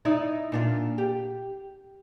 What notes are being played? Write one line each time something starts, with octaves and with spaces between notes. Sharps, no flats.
D#4 E4 D5
A#2 D4 F4
G4